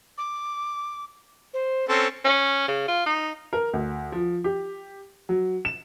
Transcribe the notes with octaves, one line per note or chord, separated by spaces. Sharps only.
D6
C5
C4 C#4 A4 C6
C#4
C#3
F4
D#4
A#4
D2
F3
G4
F#3
E7